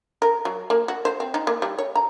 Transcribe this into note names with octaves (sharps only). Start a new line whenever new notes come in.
A#4
F#3
A#3
F#4
C5
C4
D#4
A#3
G3
C#5
A#5